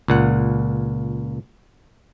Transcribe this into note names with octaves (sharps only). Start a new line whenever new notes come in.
C#2 A#2 F#5